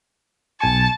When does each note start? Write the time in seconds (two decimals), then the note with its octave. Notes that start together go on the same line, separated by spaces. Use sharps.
0.60 B1 G#5 A5 C#6